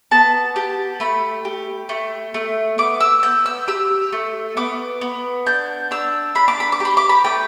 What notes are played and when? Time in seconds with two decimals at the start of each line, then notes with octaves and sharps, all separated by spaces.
0.11 B3 A5
0.56 G4
1.00 A3 B5
1.45 G4
1.89 A3
2.34 A3
2.78 B3 D6
3.00 E6
3.23 B3 G6
3.46 E6
3.68 G4 E6
4.13 A3
4.57 B3 D6
5.01 B3
5.46 D4 G6
5.91 D4 E6
6.35 D4 B5
6.48 D6
6.60 B5
6.72 D6
6.80 G4 B5
6.97 D6
7.09 B5
7.24 A3 G5